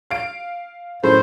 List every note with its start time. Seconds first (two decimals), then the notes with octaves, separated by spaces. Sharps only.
0.11 F5 D7
1.04 F#2 A2 C5